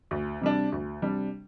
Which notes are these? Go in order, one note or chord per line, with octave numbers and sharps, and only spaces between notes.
D2
C3 G3 D4
D2
C3 G3 D4